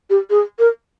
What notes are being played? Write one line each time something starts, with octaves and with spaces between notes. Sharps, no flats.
G4
G#4
A#4